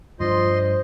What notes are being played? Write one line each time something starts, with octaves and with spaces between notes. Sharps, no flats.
G2 F3 D4 F4 C5 D#5 C6